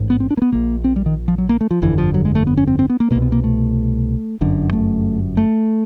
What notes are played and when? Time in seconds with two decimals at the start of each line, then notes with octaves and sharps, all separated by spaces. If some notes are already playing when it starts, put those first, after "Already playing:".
Already playing: A1 G#2
0.10 B3
0.20 C4
0.31 D4
0.37 A#3
0.42 B3
0.52 A#1 A#2 A#3
0.84 C4
0.96 G3
1.06 D#3
1.28 F3
1.38 F#3
1.49 A#3
1.61 A3
1.71 F3
1.82 G1 F2 D3 E3
1.98 F3
2.14 F#3
2.25 G#3
2.35 A3
2.47 B3
2.57 C#4
2.67 C4
2.79 C4
2.90 B3
3.00 A#3
3.11 B2 A#3
3.15 C2
3.22 B3
3.32 A#3
3.44 A3
4.41 G1 F#2 D3
4.73 A3
5.37 A3